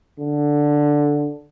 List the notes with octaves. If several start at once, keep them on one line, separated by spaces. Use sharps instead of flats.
D3